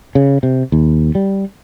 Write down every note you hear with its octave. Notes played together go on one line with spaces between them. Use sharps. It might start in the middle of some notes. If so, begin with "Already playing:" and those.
C#3
C3
D#2
G3